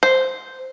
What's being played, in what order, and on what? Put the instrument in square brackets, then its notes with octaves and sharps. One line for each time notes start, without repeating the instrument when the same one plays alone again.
[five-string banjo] C5